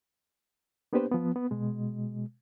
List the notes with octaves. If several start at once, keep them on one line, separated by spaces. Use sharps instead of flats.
A#3 B3 D4 G4 B4 C5
F3 B3
B3
B2 G#3